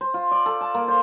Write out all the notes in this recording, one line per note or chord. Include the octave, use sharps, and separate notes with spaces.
C5
F4
D5
A4
A5
A#3
C5